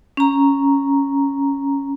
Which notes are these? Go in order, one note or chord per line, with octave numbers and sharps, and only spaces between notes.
C#4 A#5